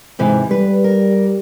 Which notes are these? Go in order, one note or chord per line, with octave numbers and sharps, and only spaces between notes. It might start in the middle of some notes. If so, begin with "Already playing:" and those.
G#2 C3 E3
G3 B4
A#4